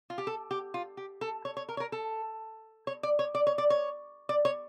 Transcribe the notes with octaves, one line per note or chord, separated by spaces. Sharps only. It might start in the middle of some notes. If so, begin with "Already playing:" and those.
F4
G4
A4
G4
F4
G4
A4
C#5
C#5
A#4
C#5
A#4
A4
C#5
D5
C#5
D5
C#5
D5
C#5
D5
C#5